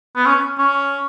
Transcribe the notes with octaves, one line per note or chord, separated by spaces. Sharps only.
B3
C#4
C#4